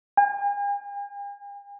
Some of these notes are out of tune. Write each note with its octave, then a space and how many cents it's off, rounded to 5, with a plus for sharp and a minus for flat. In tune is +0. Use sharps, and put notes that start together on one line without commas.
G#5 -45